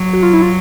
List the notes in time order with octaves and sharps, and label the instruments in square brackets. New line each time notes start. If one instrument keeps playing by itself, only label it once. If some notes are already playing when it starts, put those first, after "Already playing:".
Already playing: [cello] F#3
[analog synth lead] F#4
F4
E4
F4